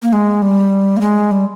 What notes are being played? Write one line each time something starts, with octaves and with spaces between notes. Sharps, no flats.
A#3
G#3
G3
A#3
G#3
G3